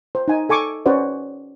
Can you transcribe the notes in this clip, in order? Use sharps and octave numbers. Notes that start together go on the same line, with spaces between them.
C5
D#4 G#5
A4 G#5 C#6 D6
C#4 F#4 B4 C5 D5